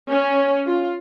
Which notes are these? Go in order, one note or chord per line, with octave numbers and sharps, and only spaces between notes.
C#4
F4